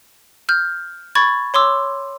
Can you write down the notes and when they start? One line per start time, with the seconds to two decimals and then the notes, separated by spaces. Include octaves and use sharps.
0.49 F6 G6
1.15 B5 C#6 G#6 A6
1.54 C#5 C6 D6 E6